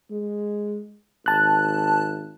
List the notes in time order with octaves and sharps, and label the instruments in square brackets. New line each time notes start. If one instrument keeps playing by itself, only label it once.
[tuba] G#3
[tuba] G#1 [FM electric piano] A5 F#6